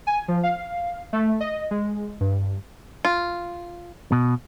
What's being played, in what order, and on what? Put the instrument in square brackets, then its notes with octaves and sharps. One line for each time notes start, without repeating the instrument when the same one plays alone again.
[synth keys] G#5
F3
F5
A3
D#5
G#3
G2
[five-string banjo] F4
[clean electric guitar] B2